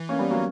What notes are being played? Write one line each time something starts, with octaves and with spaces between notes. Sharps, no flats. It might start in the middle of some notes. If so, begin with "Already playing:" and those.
Already playing: E3
A#3 C#4
G3 B3
F#3 A#3